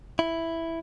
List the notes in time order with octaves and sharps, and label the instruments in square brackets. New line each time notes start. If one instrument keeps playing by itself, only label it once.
[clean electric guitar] E4